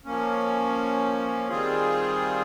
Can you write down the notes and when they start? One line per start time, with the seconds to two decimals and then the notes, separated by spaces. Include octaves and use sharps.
0.05 F3 A#3 C#4
1.48 D#3 G3 C4 F4 G#4